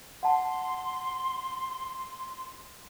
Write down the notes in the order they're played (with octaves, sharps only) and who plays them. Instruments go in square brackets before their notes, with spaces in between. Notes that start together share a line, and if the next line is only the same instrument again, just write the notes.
[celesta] F#5 A5 [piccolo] C6